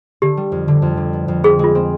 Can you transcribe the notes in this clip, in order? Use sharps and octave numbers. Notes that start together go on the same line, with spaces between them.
D3 G4
G3
F2
D3
F2
D3
B3
F2
C4 G#4
G#3 F4
C4